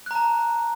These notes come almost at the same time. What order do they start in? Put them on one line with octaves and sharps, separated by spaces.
F#6 A#5 A5